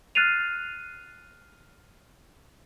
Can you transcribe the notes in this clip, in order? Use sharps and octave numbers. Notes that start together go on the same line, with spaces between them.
F6 F#6 A6 C7 D#7 F7